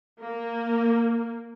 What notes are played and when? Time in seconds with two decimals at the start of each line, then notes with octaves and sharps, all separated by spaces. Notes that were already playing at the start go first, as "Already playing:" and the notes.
0.22 A#3